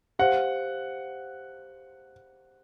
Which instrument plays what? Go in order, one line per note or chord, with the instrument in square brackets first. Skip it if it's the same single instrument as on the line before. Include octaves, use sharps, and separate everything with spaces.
[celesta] G4 C5 F5 [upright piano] F#5